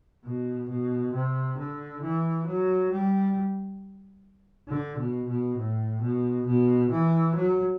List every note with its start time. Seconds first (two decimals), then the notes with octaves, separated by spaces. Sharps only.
0.25 B2
0.69 B2
1.14 C3
1.58 D3
2.02 E3
2.46 F#3
2.91 G3
4.69 D3
4.98 B2
5.28 B2
5.58 A2
6.01 B2
6.46 B2
6.91 E3
7.35 F#3